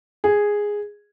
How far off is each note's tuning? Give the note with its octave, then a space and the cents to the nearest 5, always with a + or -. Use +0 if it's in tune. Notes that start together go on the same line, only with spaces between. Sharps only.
G#4 -5